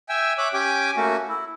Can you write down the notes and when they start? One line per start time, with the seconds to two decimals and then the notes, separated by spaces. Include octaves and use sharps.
0.09 E5 G5 G#5 E6
0.38 C#5 E5 D6 F#6
0.54 C#4 G4 G5 G#5 D6
0.97 A3 A#3 C#4 F#4
1.28 E4